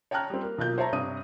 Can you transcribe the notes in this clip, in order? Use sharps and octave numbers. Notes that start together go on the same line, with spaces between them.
C#5 G5 A5 A#5 F6 F#6
G3 C4
A#3
B1 A#3 F4 F#6 G6
C5 C#5 E5 A5 A#5
G2 C3 C#5 D#6 D#7